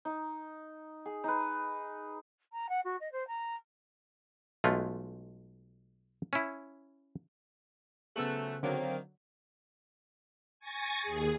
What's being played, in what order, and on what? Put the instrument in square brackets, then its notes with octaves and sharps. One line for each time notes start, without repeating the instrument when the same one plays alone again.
[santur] D#4
G#4
D#4 B4
[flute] A#5
F#5
F#4
D#5
C5
A#5
[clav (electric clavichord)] B1 G#3 A3 F4
C#4 E4
[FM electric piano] C#3 B3 G#4 [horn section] F3 F#3 A3 [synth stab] E6 F#6
[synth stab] D3 F#3 [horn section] D#3 A#3 [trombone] C4
[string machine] G#5 C#6 A6 A#6
D#2 G#4